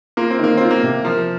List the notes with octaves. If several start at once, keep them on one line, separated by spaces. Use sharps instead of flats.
A#3 F4
C4
D#3 A#3
C4 F4
A#3
C3
F3 A#4